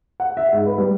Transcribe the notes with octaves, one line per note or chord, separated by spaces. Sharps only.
F#5
E5
G#2
B4
G3